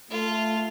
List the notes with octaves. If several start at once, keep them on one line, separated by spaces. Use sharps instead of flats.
A3 F4